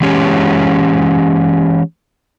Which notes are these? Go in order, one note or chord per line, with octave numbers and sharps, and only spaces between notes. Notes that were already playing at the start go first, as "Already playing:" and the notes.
E3 G#3 C#4 G4